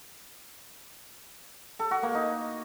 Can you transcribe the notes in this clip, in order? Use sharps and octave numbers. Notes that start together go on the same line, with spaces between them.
A4
F#4
A#3
D#4